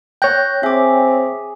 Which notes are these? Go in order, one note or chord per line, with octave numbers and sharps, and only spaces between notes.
C#5 G5 F#6 G6 A#6
C4 G#4 E5 D6